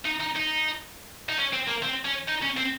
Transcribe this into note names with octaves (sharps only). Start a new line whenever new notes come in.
D#4
D#4
D#4
D#4
C#4
C4
A#3
C4
C#4
D#4
C#4
C4